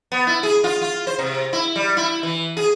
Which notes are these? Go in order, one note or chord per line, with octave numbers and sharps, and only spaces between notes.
B3
E4
G#4
F4
F4
C5
C3
E4
G3
E4
E3
G#4